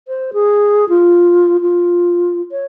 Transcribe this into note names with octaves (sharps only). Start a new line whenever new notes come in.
C5
G#4
F4
F4
C#5